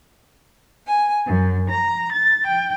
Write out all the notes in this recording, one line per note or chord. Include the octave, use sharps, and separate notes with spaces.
G#5
F#2
A#5
A6
G5